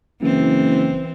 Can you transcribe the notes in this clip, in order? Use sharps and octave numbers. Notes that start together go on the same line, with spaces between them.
F#1 E3 C4